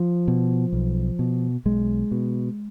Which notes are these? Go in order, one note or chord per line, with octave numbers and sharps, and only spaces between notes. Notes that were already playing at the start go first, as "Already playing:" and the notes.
Already playing: F3
B2
B1
B2
B1 G#3
B2